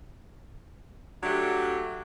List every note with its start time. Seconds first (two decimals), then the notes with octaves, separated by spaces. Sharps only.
1.23 F#3 A3 D4 G4